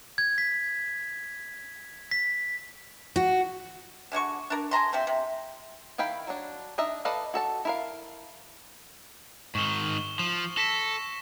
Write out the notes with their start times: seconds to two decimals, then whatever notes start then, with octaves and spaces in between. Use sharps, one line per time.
0.18 G#6
0.38 B6
2.11 B6
3.16 F#4
4.12 D3 G#3 F#4 C#6
4.50 D4 A#4
4.71 G#4 A5 A#5 C6
4.93 C3 F3 C4
5.07 C3
5.98 D#3 E4 F5 G5 B5
6.27 F#3 D4
6.78 D4 D#4 D#5 E5
7.05 A4 B4 D5 D#5 F5
7.34 F#4 A4 A5
7.65 E4 A#4 F5
9.55 G#2 D#3 C#6 E7 G7
10.19 F3 E7
10.57 A4 A#6 B6 E7